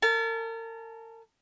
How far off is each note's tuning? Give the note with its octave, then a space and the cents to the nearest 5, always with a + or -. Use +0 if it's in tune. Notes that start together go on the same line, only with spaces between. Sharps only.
A#4 -40 A5 -30